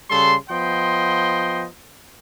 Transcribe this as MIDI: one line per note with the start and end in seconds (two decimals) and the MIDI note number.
0.10 0.35 49
0.10 0.35 55
0.10 0.35 69
0.10 0.35 84
0.50 1.65 53
0.50 1.65 59
0.50 1.65 75
0.50 1.65 79
0.50 1.65 84